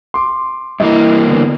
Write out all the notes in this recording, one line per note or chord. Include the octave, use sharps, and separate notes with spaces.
C6 D6
G2 E3 A#3 E4 D#5
D3 B3